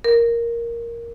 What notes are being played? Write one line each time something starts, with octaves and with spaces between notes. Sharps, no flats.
A#4